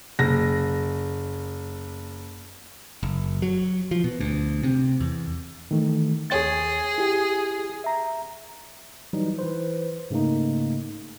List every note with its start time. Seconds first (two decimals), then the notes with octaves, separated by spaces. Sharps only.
0.19 F#1 A#6
3.03 F#1
3.42 F#3
3.91 F3
4.04 B2
4.21 D2
4.63 C3
5.00 E2
5.71 D#3 E3 A3
6.30 D#2 G#4 C#5 A6
6.98 E4 G4
7.84 E5 A#5
9.13 E3 F#3 G3 D#4
9.39 E3 B4 C5
10.10 G#2 C#3 A3 A#3 D#4